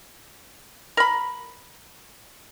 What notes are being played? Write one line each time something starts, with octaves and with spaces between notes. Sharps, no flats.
A#4 B5